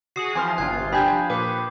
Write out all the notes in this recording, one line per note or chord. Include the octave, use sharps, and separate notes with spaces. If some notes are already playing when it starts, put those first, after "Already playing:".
F#4 G#4 D#6 C7
E3 F3 C4 G#5 C6 F6
G1 C3 F4 F#6 G#6 C7
F3 D4 G4 G#5 B5 G6 G#6
A#2 B4 D6